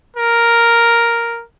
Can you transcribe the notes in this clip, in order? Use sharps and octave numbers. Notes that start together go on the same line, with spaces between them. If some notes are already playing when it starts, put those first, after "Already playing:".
A#4